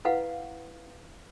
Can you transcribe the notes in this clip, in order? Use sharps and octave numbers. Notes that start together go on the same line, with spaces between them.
E4 B4 F5 F#5